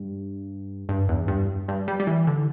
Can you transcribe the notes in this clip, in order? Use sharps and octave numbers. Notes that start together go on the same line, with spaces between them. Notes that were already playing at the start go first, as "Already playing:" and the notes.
Already playing: G2
G2
E2
G2
G2
G3
G3
E3
D3